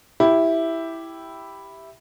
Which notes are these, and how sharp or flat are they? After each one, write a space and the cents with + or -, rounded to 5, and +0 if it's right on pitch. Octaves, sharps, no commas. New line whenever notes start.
E4 +0 G4 +0